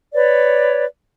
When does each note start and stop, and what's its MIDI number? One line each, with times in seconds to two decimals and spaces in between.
0.13 0.86 71
0.13 0.86 73
0.13 0.86 74